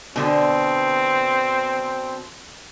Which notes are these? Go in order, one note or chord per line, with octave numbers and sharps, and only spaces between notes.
B2 D3 C4